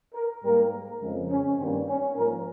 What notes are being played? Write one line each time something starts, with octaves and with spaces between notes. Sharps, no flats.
A#4
G#2 G3 A#3 A#4
F2 C#3 F3 G#3
C#4
G2 D#3 G3 A#3 C4
C#4
G#2 F3 A#3 A#4